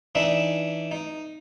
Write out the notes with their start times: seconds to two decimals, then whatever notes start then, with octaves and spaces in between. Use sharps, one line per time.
0.15 E3 D4 D#4 E5
0.91 D#4